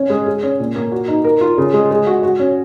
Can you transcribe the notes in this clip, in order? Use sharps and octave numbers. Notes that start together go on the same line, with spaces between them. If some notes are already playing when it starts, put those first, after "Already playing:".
Already playing: C#4
G#3
G#4
C#4
A#2
A#3
F#4
D#4
A#4
F4
C#3
G#3
G#3
F#4
F#4
C#4